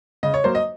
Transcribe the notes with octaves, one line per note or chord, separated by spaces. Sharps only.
C#3 D#5
C#5
F#3 A#3 C5
D#5